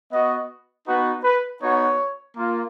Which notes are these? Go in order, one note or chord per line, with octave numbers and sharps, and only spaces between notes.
B3 F#4 D#5
B3 D#4 F#4 B4
B4
B3 D#4 F#4 C#5
A#3 F4